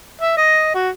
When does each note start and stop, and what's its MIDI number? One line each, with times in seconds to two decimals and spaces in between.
0.21 0.35 76
0.37 0.70 75
0.75 0.89 66